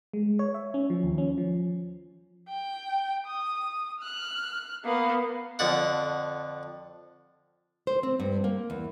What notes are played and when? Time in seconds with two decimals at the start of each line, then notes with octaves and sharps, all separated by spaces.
0.13 G#3
0.39 C#5
0.54 E5
0.74 C#4
0.90 F3
1.03 D#2
1.18 C#4
1.38 F3
2.48 G5
3.27 D#6
4.01 F6 F#6
4.85 A#3 B3
5.59 F2 D3 F#5
7.87 C5
8.03 C4
8.20 G2
8.44 A#3
8.70 E2